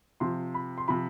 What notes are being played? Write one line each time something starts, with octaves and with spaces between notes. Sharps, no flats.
C3 F3 C6
B5
C6
C3 F3 B5